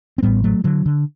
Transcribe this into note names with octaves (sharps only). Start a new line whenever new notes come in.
C4
A1 A2 G3 B3
F#3 A3
D3 F#3
D3